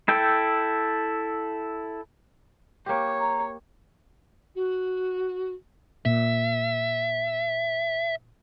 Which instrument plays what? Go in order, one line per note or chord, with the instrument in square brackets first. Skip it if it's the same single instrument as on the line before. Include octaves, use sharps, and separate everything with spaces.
[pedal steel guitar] E4 A4 G5
[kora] A#3 G4 [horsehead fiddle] C#5
[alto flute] A#5
[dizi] F#4
[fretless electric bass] A#2 [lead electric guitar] E5